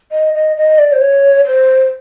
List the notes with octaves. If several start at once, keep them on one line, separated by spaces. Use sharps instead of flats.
D#5
D#5
D#5
D5
C5
C#5
C5